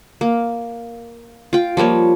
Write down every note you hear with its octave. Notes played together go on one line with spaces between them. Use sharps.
A#3
F4 G5
F3 G3 A#3 C#5